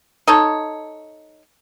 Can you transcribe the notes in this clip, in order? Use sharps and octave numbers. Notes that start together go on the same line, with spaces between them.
D#4 A4 C#5